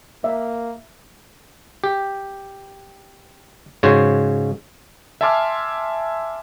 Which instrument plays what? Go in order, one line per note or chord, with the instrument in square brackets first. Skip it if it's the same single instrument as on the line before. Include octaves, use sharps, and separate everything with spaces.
[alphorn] A#3 [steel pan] E5
[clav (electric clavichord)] G4
G#2 C#3 F#4 C5 C#5
[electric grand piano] E5 G#5 A5 C6 D6 F6